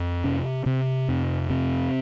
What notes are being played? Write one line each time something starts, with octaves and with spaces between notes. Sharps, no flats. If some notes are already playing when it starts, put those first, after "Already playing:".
Already playing: F2
C3 C#4
C3 C4
F2 C4
C3 C4